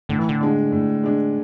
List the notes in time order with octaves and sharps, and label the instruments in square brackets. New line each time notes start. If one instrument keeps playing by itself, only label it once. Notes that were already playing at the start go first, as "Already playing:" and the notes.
[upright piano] A2 [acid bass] D3
[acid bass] E3
D3
[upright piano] G#3 D4
A2
G#3 D4